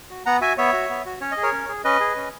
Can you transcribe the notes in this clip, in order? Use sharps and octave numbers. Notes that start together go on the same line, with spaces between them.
F#4
B3 F#5 A#5
F#4 E5 G#5
B3 C#5 E5
F#4
B3
F#4
C#4 C#5
D#5
G#4
A#4 C#5
C#4
G#4
C#4 B4 D#5
G#4
C#4